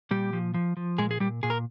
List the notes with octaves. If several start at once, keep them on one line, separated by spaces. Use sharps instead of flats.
A#2 G3 G4
F3
F3
F3
A#2 G#3 G#4
G#4
A#2 G3 G4
A#2 G#4
A#4